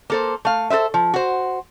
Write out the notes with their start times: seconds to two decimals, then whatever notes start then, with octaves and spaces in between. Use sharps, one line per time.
0.10 A#3 A4 C5
0.45 A3 F5
0.70 A4 B4 C5 E5
0.94 F3
1.14 F#4 C5